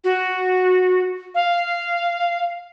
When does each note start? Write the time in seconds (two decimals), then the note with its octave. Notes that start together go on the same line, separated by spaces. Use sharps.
0.04 F#4
1.35 F5